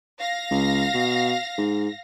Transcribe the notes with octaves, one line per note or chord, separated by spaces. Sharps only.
F5 A#6
C#2
B2
G#2